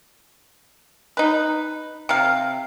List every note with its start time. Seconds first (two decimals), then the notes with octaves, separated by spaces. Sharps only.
1.17 D#4 B4
2.09 C3 F5